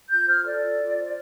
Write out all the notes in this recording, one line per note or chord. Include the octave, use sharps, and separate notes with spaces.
F4 G6
C5 F6
A4 D5
F4
F4
C5